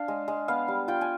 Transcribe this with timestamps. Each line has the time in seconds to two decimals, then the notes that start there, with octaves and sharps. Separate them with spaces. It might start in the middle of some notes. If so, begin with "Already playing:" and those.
Already playing: D4 F5
0.08 G#3
0.28 G#3
0.48 B3 F5
0.68 G3
0.88 F4 G5
1.01 G#5